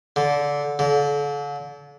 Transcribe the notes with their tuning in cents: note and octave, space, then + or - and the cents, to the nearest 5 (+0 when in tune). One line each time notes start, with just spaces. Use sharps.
D3 -20
D3 -40